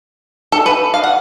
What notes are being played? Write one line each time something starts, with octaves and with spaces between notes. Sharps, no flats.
A4
B4
F5
F#5